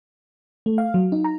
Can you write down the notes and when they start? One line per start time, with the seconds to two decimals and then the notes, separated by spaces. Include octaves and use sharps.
0.66 A3
0.78 F5
0.94 F#3
1.12 D#4
1.24 A#5